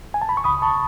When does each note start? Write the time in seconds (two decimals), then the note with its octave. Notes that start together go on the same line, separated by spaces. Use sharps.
0.14 G#5
0.22 A5
0.29 B5
0.37 C#6
0.44 C#2 B5 D#6
0.62 A5 C#6